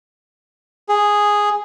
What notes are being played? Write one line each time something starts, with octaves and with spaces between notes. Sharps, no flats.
G#4